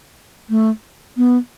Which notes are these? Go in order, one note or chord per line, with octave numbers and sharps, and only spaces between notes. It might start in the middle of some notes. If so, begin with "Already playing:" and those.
A3
B3